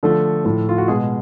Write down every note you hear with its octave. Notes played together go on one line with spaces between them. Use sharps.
D3 F3 A3 A4
A2 F3 A3
F4
F#4
B2 G#3 G#4